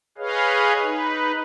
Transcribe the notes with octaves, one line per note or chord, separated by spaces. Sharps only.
G#4 B4 C#5 D#5 F5
D#4 B4